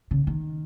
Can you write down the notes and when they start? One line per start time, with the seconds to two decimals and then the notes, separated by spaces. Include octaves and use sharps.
0.11 C#3
0.27 D#3